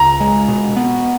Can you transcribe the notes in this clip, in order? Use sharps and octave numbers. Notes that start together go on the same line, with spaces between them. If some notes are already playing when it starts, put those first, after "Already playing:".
Already playing: C#2 A#5
G#3
B2
B3